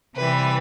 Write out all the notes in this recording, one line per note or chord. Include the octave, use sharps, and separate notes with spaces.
C3 E3 G3 B4